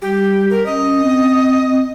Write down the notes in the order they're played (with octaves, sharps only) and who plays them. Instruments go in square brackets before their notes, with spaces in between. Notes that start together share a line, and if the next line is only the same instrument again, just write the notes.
[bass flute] G3 [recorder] G4
[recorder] A#4
[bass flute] C#4 [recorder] D#5
[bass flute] C4